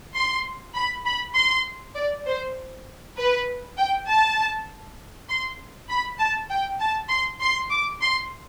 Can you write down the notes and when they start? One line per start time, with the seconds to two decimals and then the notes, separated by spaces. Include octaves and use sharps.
0.15 C6
0.74 B5
1.05 B5
1.35 C6
1.95 D5
2.26 C5
3.17 B4
3.77 G5
4.07 A5
5.29 C6
5.89 B5
6.18 A5
6.50 G5
6.80 A5
7.09 C6
7.40 C6
7.71 D6
8.01 C6